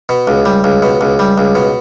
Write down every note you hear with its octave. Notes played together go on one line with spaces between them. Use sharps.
B2
C#2
G3
C#2
B2
C#2
G3
C#2
B2